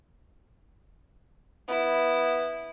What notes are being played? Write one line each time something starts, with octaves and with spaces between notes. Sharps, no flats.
B3 E4